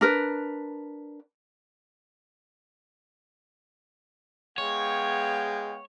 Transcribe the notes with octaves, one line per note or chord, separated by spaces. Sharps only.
D4 A#4 B4
G#3 B3 C#5 F5 G5